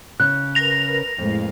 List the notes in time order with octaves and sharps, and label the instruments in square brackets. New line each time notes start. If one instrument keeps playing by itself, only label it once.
[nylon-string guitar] C#3 [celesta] F#6
[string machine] A#4 B4 [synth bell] A#6 F7
[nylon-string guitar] F2 [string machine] A2 G#3 F5